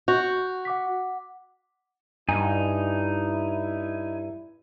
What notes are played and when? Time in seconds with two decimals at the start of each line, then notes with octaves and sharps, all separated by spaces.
0.08 F#4 C#6 G6 F7
0.65 F#5 D6 B6
2.29 G2 D#4 E4 G#5